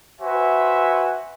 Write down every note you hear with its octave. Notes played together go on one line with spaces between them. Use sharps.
F#4 B4 C5 E5 G#5